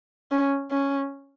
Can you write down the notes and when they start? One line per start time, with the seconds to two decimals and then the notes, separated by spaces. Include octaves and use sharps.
0.31 C#4
0.71 C#4